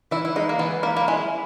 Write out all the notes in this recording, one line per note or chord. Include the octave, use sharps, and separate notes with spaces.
E3 E4
E4
G#3 D#4
A#3
E3 B3
A#3 E4
A#3
G#3 E4